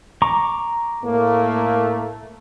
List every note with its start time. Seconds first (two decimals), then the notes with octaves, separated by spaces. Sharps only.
0.22 A#5 C#6 D6
1.03 A2 A3 A#3